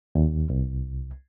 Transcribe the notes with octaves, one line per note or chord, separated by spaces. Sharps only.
D#2
C2